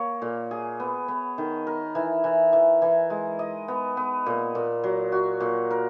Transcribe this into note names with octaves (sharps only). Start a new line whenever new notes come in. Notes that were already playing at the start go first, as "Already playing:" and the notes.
Already playing: A#3 C#5
A#2
G#4
B3
B3
D#3
A#4
E3
E3
E3
E3
G#3
D#5
B3
B3
A#2
A#2
F#3
F#4
A#2
A#4